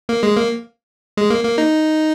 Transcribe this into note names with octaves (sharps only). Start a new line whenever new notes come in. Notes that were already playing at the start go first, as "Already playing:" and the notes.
A#3
G#3
A#3
G#3
A#3
A#3
D#4